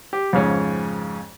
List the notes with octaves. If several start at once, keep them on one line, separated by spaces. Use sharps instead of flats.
G4
F2 G#2 C#3 C#4